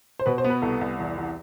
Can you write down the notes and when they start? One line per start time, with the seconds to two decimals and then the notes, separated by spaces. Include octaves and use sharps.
0.19 C5
0.26 B2 B4
0.38 C5
0.44 B3
0.50 B4
0.62 C2 A4
0.81 C2
0.99 E2
1.17 E2